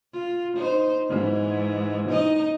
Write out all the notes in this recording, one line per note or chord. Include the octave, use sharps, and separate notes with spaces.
F4
D#4 C5
G#2 E3
D#4 D#5